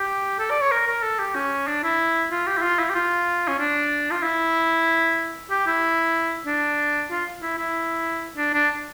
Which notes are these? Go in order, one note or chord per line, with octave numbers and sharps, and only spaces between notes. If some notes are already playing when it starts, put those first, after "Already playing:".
Already playing: G4
A4
D5
C#5
A#4
A#4
A4
G4
C#4
D4
E4
F4
G4
E4
F4
E4
G4
F4
C#4
D4
F4
E4
G4
E4
D4
F4
E4
E4
D4
D4